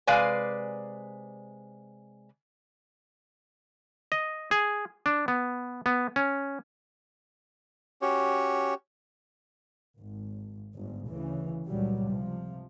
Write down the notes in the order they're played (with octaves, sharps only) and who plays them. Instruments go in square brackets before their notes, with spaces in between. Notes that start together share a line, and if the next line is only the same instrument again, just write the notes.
[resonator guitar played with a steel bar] C3 G#3 B4 D5 F5 G#5
[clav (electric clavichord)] D#5
G#4
D4
B3
B3
C#4
[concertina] C#4 F#4 G4 C#5
[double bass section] G#1
G1 G#2
D2 C#3 E3
C#2 G2 A#2 F#3 G3
C3 F3